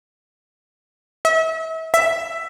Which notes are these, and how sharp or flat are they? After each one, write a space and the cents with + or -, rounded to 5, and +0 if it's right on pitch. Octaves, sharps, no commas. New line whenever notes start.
E5 -35
E5 +10